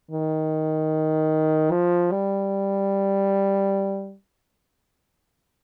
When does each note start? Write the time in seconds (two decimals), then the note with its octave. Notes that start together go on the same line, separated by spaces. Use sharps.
0.11 D#3
1.71 F3
2.11 G3